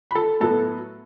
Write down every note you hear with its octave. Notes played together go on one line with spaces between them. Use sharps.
B5
A4 A5
A2 F#3 B3 A4 A5